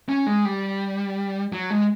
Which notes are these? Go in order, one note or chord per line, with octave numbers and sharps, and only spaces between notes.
C#4
G#3
G3
F#3
G#3